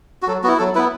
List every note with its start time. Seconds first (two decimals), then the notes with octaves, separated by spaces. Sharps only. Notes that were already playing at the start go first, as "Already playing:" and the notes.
0.22 F#4
0.27 F#3 A4
0.44 B3 F#4
0.48 E4
0.59 F#3 A4
0.75 E4 B4
0.78 B3